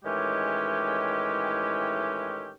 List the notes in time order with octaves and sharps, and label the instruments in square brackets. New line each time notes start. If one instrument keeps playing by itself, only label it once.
[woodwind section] A2 D#3 E3 G#3 C#4 G4